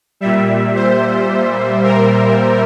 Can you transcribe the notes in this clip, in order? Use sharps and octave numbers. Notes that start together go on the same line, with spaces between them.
A#2 G3 E5
C5
A#4